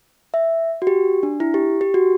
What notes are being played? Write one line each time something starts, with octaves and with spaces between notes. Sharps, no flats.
E5
F#4
G4
D4
E4
G4
G4
F#4